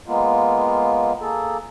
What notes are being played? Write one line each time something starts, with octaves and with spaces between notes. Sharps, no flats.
G#3 A#3 B3 F4
A#3 G#4 A4